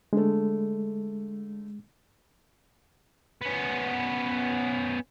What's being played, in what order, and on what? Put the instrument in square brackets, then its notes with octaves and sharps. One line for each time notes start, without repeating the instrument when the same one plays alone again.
[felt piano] D3 A3 [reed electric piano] G#3
[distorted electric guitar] B3 C#4